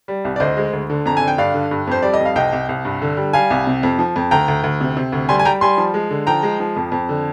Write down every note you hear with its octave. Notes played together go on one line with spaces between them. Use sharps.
G3
C2
D5
D2 C5 D#5
G#3
D2
D3
F2 A#5
D3 G#5
G5
G2 D5 F5
D3
G2
F2 C5
G3 D5
D#5
F2
F5
C2 D#5 G5
C2
C2
G2
D3
G3
G3 F5 G#5
C2
C3
F2
F3
F2
D2 G5 A#5
D2
D2
C3
C3
D2
G3 G#5 C6
G#5
G3 G5 A#5
G3 G#5 C6
F3
G#3
D3
F3 G5 A#5
G#3
F3
F2
F2
D3